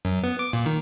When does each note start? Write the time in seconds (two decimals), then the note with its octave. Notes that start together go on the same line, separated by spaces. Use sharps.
0.05 F#2
0.24 B3
0.39 D6
0.53 A#2
0.66 D#3